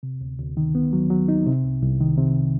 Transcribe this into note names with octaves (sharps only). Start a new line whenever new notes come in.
C3
D2
D2
D#3
B3
F#3
F#3
D#4
C3
C2
C2
D#3
C3